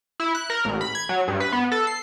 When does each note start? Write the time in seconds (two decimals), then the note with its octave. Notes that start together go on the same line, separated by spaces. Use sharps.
0.20 E4
0.35 F#6
0.50 A#4
0.65 A1
0.81 B5
0.95 G#6
1.09 F#3
1.28 G2
1.40 B4
1.52 B3
1.72 A4
1.87 C7